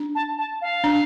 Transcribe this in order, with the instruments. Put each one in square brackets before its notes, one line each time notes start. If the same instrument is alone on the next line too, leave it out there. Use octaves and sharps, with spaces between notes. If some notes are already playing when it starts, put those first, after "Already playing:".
Already playing: [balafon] D4
[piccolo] A5
A5
F5
[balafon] D4